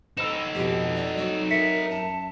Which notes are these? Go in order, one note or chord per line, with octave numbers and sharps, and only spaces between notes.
D#4 A4 C5 B5 E6 E7
F2 B2 G4
D5
F#3 C4 F#4
A#4 E5 B6 C#7
F#2 A5